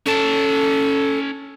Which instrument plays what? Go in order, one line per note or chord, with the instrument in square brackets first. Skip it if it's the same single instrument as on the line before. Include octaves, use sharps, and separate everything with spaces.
[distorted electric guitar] C#4 A5 [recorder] A4